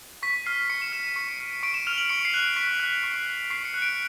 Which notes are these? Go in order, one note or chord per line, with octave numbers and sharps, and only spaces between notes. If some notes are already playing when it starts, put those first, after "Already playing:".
C#6 B6
F6 C7
C#6 C#7
E7
F6 E7
D#7
C#6 C#7
D7
F6 C#7
C#6 D7
E7
F6 F7
F#7
C#6 C#7
C7
F#6
C#6 B6
F#6
C#6
F#6
C#6 C7
C#7
F#6
D7